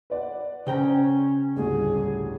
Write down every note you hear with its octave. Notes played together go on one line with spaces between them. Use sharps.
B4 D5 F#5
C#3 C#4 C5 G5 A#5
A1 D2 G2 G#4